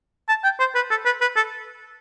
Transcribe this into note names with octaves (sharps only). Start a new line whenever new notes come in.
A5
G5
C5
B4
A4
B4
B4
A4